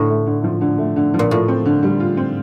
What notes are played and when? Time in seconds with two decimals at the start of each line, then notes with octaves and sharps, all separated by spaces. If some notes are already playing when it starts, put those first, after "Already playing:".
Already playing: A2 D3
0.10 A3
0.26 D3
0.44 F3
0.61 D3
0.78 A3
0.96 D3
1.14 F3
1.19 A#2
1.31 A2 F4
1.48 C4
1.65 D3
1.83 G3
2.00 F4
2.17 C4